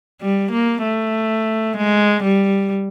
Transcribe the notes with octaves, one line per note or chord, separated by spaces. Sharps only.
G3
A#3
A3
G#3
G3